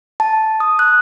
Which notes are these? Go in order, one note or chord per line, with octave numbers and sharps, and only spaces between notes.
A5
D#6
F#6